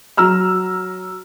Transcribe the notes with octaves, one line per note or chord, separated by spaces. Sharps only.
F#3 A#5 E6 F6